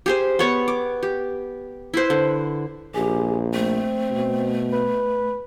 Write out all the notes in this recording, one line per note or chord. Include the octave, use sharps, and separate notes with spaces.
G4 G#4 C5
B3 C#5 C#6
D6
G4
E4 B4 C5
D3
A#1 G4 G#4
A3 C4
B2
B4